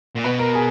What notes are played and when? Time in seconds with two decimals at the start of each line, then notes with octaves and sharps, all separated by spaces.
0.16 A#2
0.24 B2 B4
0.39 A#4
0.55 G#4